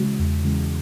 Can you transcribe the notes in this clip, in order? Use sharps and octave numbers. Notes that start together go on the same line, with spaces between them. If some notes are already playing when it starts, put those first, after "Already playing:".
Already playing: C#3 E3 G#3 F#4
E2
C#3 E3 G#3